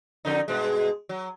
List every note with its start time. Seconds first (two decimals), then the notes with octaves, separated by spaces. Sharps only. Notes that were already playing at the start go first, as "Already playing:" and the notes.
0.25 F2 D3 D#4
0.48 G2 B2 G#3
1.09 F#3